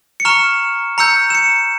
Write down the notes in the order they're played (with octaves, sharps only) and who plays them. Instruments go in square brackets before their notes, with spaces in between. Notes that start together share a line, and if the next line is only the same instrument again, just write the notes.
[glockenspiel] C#7
A#5 C#6 F6 E7
A#5 E6 G6 C#7
E7
C#7